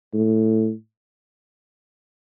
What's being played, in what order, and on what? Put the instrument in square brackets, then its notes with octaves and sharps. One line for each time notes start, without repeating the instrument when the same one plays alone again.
[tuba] A2